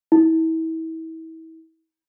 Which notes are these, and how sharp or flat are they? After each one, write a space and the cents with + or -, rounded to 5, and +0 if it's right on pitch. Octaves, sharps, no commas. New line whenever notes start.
E4 -35